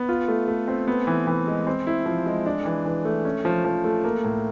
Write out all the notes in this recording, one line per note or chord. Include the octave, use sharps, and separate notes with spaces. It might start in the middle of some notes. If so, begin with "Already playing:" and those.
Already playing: B3
F4
A3
A3
C4
B3
E3
E3
G#3
C4
E4
F3
G#3
D4
E3
E3
A3
C#4
F3
F3
A3
A#3
A2